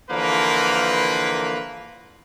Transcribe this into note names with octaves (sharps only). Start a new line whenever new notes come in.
D3 E3 F3 A#3 A#4 B4